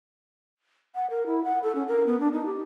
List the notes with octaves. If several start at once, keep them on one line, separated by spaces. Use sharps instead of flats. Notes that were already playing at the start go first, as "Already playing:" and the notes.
F#5
A#4
E4
F#5
A4
C#4
A#4
B3
D4
D#4
G4